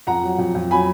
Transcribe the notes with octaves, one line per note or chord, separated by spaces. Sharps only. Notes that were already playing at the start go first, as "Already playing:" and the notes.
F2 F#5 A#5
F#3
F2
F2
F#3 G#5 B5